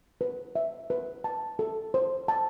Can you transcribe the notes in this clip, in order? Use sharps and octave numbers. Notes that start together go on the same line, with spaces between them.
B4
E5
B4
A5
A4
C5
A5